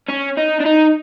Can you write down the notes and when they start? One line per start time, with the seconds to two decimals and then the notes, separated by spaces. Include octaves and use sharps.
0.08 C#4
0.37 D#4
0.60 D4
0.65 D#4